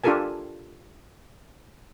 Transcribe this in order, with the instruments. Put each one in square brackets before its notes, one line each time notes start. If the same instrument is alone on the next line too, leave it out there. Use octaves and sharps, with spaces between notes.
[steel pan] D4 F4 G4 A4 A#4 G#5